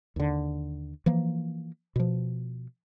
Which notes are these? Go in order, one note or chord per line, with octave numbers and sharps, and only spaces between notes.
D#2 D3
E3 F3 A#3
B2 F3